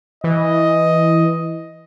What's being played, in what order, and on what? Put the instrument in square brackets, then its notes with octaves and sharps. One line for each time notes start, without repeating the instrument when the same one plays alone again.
[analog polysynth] E3 [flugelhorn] D#5